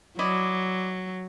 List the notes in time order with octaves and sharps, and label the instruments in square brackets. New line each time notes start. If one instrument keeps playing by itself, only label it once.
[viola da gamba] F#3 [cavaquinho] E4 D5 D#5